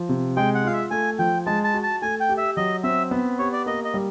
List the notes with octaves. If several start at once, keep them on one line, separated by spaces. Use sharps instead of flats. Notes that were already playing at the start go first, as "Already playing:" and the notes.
Already playing: F3
C3
G#3 G5
F#5
F4 F5
E5
A3 G#5
F3 G5
G#3 A5
A5
F#4
A5
A3 G#5
G5
G4
E5
F#3 D#5
C4 E5
B3
G4 C#5
D5
A#3 D#5
D#5
G3